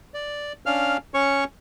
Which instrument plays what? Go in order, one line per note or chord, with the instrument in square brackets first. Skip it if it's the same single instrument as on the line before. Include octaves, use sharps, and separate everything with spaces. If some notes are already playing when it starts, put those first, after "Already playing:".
[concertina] D5
C#4 D4 F5 F6
C#4 C#5 C#6